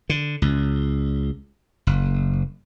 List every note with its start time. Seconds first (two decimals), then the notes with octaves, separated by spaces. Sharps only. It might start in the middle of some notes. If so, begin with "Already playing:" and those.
0.09 D3
0.42 C#2
1.87 F#1